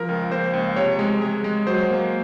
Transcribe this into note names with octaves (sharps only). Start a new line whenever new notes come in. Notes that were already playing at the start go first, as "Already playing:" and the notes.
Already playing: F3 A#4
C#2
A#3 C5
C#2
C3 C#5
G#3
G#3
G#3
F#3 C5
A#3